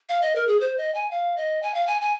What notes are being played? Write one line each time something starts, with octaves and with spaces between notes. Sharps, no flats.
F5
D#5
A#4
G#4
C5
D#5
G#5
F5
D#5
G#5
F5
G#5
G#5